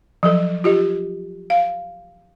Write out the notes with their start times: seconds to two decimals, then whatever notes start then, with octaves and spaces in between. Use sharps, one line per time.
0.23 F3 F#3 A4
0.64 F4 G4 D#5
1.50 F5